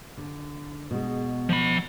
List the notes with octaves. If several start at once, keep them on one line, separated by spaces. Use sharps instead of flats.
D3
B2 G#3
F3 B5